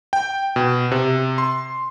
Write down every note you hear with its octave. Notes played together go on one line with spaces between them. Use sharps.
G5
B2
C3
C6